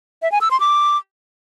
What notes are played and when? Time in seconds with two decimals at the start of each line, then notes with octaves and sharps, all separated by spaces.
0.22 E5
0.32 G#5
0.41 E6
0.51 C6
0.60 D6